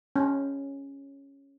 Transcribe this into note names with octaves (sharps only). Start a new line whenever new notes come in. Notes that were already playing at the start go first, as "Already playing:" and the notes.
C#4